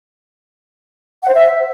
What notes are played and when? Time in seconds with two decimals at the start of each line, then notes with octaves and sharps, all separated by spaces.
1.23 F#5
1.29 C5
1.35 E5